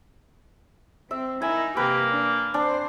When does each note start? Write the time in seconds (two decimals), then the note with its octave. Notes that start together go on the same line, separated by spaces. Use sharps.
1.11 C4 E5
1.42 D#4 E4 A#4 G#5
1.77 C3 A#3 G4 A#4 B4
2.06 D4
2.54 C4 D4 C5